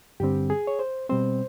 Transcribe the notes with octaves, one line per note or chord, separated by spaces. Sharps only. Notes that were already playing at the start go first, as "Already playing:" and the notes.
G2 D3 G3 C4 G4
G#4
C#5
C5
B2 G3 C4 C5